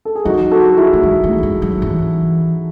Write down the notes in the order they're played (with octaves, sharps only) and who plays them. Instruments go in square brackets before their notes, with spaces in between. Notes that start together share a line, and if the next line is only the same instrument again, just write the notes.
[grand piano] A4
G#4
[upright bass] F#3 [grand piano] D#4 F#4
[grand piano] F#4 A4
E4 G#4
[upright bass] A3
G#3
A3
G#3
F#3
E3